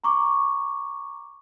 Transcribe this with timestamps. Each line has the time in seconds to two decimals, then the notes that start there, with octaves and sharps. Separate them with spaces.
0.04 A#5 C#6 D6